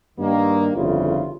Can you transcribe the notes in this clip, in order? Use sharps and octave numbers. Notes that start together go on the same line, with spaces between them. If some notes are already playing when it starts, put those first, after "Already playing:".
G2 D#3 A#3
G1 F2 C#3 E4 F4